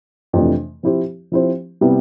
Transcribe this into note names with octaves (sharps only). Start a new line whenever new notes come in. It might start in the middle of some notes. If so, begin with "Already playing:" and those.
F2 C3 E3 A3 D4
F3 C4 E4 G4 C5
F3 C4 E4 G4 C5
C3 G3 B3 E4